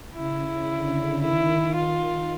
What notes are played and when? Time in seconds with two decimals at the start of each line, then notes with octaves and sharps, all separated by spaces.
0.15 C#3 E4
0.69 D3
1.21 D#3 E4
1.74 D#3 F4